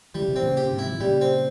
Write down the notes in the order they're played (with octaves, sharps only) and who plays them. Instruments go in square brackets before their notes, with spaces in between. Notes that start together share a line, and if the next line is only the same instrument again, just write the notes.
[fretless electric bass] E3 [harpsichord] G3
[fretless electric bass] C#3
C3 E3
[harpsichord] C4
[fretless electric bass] A#2 C#3
[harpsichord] G4
[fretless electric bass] C#3
G#2 C3
[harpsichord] E4
[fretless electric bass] F3
E3
[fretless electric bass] A#2 C#3 [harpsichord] G3
[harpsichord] C4